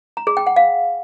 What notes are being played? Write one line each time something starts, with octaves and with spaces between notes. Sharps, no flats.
A#5
G#4
G5
F#5
F5